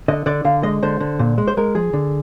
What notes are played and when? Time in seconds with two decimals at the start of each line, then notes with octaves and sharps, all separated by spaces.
0.08 D3 D#5
0.26 D3 D5
0.45 D3 F5
0.63 G#3 D#5
0.83 D3 C5
1.00 D3
1.19 A#2
1.38 G#3
1.48 C5
1.57 G#3 A#4
1.75 F3 G#4
1.93 D3